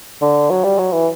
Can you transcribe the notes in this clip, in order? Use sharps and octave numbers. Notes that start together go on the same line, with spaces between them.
D3
F#3
G3
F#3
E3